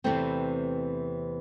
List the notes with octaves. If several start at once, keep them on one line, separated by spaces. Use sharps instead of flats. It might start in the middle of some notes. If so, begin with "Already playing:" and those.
E2 C3 E3 A3 C4